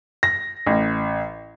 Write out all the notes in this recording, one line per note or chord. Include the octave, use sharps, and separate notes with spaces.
A#6
A1